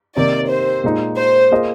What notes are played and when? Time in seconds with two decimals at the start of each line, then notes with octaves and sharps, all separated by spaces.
0.16 C3 D#3 A#3 D5
0.50 C5
0.84 A#2 G#3 D#4
1.18 C5
1.51 A#3 F4 G#4 D#5